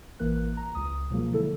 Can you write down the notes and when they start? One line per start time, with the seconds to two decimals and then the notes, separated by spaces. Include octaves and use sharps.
0.19 A1 E3 A#3 A#4 F#6
0.57 A#5
0.75 C#2 D#6
1.11 B2 F3 F#3 G#3 A#3
1.33 D3 E4 A4